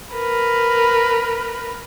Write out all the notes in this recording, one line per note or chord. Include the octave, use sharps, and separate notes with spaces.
A#4 B4